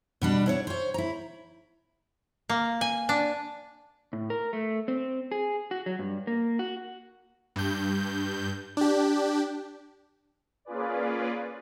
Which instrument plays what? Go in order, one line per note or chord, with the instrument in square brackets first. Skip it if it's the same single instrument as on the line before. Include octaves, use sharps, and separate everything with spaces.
[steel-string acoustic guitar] B2 G3 D4
E4 C5 C#5
C5 C#5
E4 A#5
[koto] A#3
G#5
D4
[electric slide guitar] A2
A#4
A3
C4
G#4
F#4
F#3
G2
A#3
F#4
[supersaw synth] G2 G6
D4 G4
A#3 C#4 F4 G#4 B4 D5